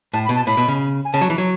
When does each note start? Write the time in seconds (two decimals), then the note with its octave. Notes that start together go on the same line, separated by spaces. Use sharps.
0.13 A2 A5
0.25 B5
0.29 B2
0.35 A5
0.47 A2 B5
0.57 B2
0.68 C#3
1.05 G#5
1.13 C#3 A5
1.21 F#3
1.30 E3
1.38 F#3